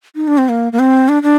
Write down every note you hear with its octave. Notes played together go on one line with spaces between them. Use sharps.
D#4
D4
C4
A#3
A#3
C4
D4
D4